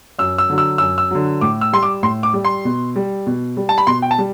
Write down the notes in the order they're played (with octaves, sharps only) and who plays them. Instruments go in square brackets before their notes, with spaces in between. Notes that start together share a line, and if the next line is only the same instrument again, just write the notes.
[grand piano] F#2 E6
E6
D3 F#3
E6
F#2 E6
E6
D3 F#3
A2 D6
E6
G3 C6
D6
A2 C6
D6
G3
C6
B2
G3
B2
G3
A5
B5
B2 C6
G5
A5
G3